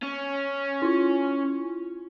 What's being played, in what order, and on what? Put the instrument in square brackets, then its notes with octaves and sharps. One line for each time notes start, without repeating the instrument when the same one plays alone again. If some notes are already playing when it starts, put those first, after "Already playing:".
[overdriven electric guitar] C#4
[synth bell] E4 F4